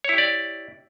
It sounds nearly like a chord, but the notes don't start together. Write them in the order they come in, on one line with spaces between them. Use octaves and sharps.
C#5 E4 G4 D5